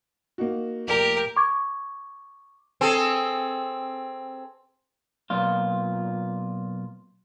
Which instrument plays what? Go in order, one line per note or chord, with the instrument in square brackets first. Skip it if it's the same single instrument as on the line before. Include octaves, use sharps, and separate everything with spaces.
[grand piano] A#3 D#4 F#4
[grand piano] F1 A#2 D5 [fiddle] G4 A#4
[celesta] C#6 D6 G#6
[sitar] C4 G#4 A4
[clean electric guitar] B1 A#2 F4